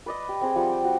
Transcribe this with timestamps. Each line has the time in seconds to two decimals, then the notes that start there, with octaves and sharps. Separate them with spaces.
0.06 B4 D5 D#5
0.29 G4
0.42 C4 G#4 G5
0.56 F3 G3 F#5
0.71 G5
0.85 G3 F#4